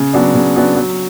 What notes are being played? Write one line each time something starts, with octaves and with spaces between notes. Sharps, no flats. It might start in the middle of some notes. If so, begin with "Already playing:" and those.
Already playing: C#3
F#3 B3 D4
C#3
F#3 B3 D4
F#3